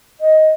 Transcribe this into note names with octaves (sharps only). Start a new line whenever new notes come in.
D#5